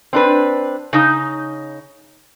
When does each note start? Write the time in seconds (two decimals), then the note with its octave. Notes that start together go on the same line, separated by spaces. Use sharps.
0.13 C4 D4 B4
0.93 C#3 D#4